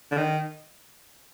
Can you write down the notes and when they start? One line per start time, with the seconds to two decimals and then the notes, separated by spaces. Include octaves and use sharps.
0.11 D3
0.17 D#3